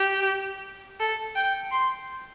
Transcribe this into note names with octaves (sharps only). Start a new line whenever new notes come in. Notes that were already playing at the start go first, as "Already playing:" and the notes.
Already playing: G4
A4
G5
C6